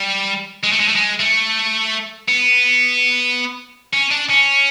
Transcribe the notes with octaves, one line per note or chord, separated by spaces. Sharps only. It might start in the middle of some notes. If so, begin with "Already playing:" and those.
Already playing: G3
G#3
A3
G#3
A3
G#3
A3
B3
C#4
D4
C#4